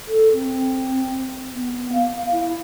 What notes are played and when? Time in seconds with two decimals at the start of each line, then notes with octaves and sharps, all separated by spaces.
0.08 A4
0.33 C4
1.53 B3
1.93 F5
2.32 E4